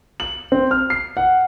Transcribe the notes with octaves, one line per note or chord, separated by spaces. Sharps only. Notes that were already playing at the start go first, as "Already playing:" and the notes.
F#7
C4
F6
C7
F#5